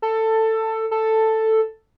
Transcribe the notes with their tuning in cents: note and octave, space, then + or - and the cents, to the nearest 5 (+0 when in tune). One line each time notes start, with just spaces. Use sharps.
A4 +15
A4 +5